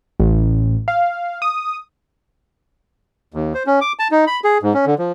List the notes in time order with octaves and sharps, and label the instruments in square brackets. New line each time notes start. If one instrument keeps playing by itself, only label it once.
[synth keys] A1
F5
D#6
[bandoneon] D#2
C5
C#4
D6
A5
D#4
B5
G#4
G#2
C#4
D3
F3